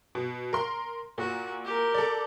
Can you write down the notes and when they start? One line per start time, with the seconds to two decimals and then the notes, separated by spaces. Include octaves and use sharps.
0.15 B2
0.53 A#4 C6
1.18 A#2 F#4
1.64 G4 A#4
1.94 A4 D5